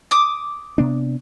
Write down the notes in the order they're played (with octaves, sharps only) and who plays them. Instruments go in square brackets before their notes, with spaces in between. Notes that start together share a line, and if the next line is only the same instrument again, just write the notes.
[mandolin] D6 D#6
[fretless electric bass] C3 B3 D4